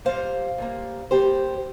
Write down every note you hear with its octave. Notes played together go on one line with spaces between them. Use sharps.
A#2 G3 A#3 C5 F5
A#2 G3 A#3
G3 A#3 G4 C5